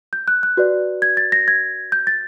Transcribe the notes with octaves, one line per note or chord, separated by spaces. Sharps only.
G6
F#6
F#6
F#4 B4 D5
G#6
A6
A#6
G#6
G6
A6